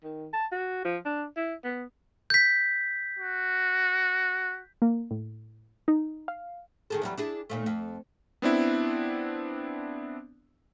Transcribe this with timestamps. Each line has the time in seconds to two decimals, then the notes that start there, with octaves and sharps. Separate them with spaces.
0.04 D#3
0.33 A5
0.52 F#4
0.85 F3
1.05 D4
1.37 E4
1.64 B3
2.30 G6 B6
3.18 F#4
4.82 A#3
5.11 A2
5.88 D#4
6.28 F5
6.90 D#3 G#4 A4
7.02 E2 F#3 G3
7.18 D4 E4 G#4
7.50 D#2 A#2 A3
7.66 F2
8.42 B3 C4 D4 E4